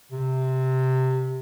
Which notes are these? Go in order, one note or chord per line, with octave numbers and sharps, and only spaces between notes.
C3